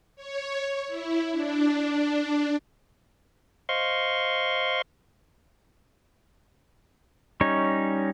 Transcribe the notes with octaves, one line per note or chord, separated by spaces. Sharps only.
C#5
E4
D4
C5 D#5 F5 C6 C#6
G3 C#4 D#4 C#5